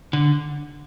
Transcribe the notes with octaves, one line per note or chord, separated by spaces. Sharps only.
D3